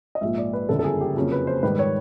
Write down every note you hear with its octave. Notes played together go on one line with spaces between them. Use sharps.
D#5
A#1 G#2 F3 A#3 E5
D5
B4
F#1 F2 D3 G3 A4
A4
G#4
G4
F2 C#3 F#3 A#3 C#4
B4
C5
G#2 D#3 G3 B4
C#5